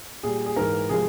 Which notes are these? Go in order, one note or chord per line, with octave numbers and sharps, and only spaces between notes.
A#2 G3 G#4
G#4
G#2 E3 G#3 A#4
C3 F3 G#3 G#4